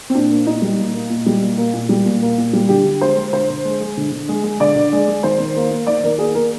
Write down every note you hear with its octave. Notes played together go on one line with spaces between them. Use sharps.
C4
A#2 D4
A#3
A#2 D#4
G3
A#2
A#3
A#2
G3
A#2
A#3
A#2
G3
A#2
A#3
A#2
G3
D3 G4
D3
G#3 C5
G#3
D3 C5
D3
G#3
G#3
D3
D3
G#3
G#3
D3 D5
D3
G#3
G#3
D#3 C5
D#3
A#3
A#3
D#3 D5
D#3 A#4
A#3 G#4
A#3 A#4